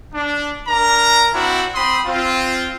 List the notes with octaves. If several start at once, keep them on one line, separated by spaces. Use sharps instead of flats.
D4
D4 A#4 A#5
C4 D4 E4 F#4
C4 B5 C6 D#6
C4 F4